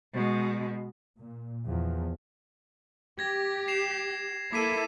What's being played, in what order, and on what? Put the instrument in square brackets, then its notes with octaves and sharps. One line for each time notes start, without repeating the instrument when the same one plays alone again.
[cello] B2 G#3
[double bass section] A#2
E2 F3
[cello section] G4 [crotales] G#6 A#6
[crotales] C7 E7 F7
[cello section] A#3 E4 A4 [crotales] D6 B6 D#7